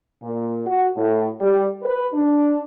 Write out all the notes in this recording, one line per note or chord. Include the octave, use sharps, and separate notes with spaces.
A#2
F#4
A2
G3
B4
D4